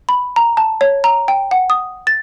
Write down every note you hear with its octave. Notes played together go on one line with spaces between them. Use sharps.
B5
A#5
A5
C#5
A#5
G5
F#5
D#6
A6